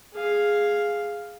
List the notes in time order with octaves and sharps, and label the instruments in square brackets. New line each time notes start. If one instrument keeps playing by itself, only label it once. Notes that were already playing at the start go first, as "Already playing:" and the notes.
[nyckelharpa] G#4 F5